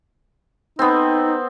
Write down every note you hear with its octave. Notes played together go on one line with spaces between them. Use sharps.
B3 C4 D#4